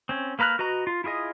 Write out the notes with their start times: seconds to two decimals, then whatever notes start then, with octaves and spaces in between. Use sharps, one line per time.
0.09 C4 C#4
0.39 A#3 B4 A#5 F6 F#6
0.59 F#4 B4 D#5 A#5
0.87 F4
1.04 E4 F4 G#4 D#5